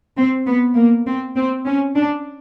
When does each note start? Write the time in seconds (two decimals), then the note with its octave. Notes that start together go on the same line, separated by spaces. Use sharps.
0.17 C4
0.46 B3
0.76 A#3
1.06 C4
1.36 C4
1.66 C#4
1.96 D4